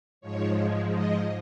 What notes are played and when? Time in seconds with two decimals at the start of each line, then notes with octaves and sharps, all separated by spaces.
0.21 G#2 F3 G#3 C#5
0.89 D#5